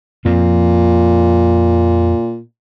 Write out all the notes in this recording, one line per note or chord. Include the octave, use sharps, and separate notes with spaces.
F2 A#2 F3 C4